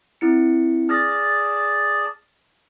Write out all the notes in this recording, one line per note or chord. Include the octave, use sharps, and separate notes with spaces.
C4 E4 C#7
G#4 D5 A5 F6 A6 A#6